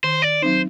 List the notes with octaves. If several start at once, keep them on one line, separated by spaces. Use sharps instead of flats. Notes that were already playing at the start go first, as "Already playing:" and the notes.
D#3 C5
D5
F#3 C4 D#4 C5